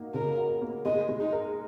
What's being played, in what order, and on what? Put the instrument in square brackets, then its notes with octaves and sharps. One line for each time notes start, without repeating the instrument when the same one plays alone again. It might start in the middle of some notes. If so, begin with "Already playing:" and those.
Already playing: [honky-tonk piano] A#3 D#4 F#4
[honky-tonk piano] C#3 [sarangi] A#4
[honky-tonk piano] F#4
A#3
[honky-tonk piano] G#3 [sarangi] D#5
[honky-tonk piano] G#3
[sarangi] D#4
[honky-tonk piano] A#4